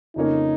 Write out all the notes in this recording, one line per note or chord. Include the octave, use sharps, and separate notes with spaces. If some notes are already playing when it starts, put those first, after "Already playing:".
F2 C#3 A#3 C#4 D#4 A#4